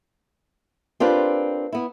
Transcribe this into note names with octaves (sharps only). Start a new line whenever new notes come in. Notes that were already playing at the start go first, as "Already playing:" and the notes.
C4 D4 F4 G4 A#4 B4
B3 E4